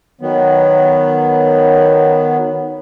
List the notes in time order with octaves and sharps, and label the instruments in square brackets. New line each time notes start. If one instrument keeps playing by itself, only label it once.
[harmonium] D#3 F#3 B3